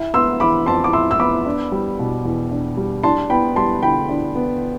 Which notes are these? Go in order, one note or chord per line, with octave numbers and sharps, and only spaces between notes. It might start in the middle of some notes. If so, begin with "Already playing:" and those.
Already playing: E4
B3 C6 E6
E3 B5 D6
F2 A5 C6
D6
E4 C6 E6
E6
B3 B5 D6
D4
G3
B2
E2
D4
G3
D4 A5 C6
B3 G5 B5
G3 A5 C6
D3 G5 B5
D4
B3